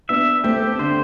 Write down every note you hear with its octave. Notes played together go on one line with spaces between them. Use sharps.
B3 D4 E5
A3 C4 G4
D3 C5